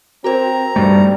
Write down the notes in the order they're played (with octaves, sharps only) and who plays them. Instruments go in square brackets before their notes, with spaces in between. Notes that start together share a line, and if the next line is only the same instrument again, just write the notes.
[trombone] C4 [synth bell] F#4 A#4 C5 [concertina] A#5
[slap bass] G2 A3 [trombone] G3